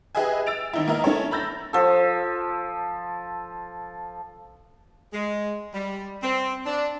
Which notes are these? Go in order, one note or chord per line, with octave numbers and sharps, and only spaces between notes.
G4 G#4 B4 D#5 E5 G#5
E6 A6 D7 F7
G#1 D#4 E4
A#3 E4 A#4 D#5
C#4 E4 A4 C#5
A#5 B5 E6 G6 A6 A#6
F3 A4
G#3
G3
C4
D4